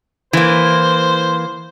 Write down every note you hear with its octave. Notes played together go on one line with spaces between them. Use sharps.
E3 A#3 C5